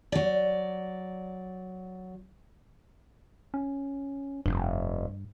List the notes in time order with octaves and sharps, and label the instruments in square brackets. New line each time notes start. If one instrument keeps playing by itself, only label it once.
[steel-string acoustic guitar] F#3 D5
[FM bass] C#4
[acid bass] F1 [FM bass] G2